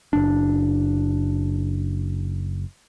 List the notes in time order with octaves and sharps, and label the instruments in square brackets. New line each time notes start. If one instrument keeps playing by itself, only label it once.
[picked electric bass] F#1 D4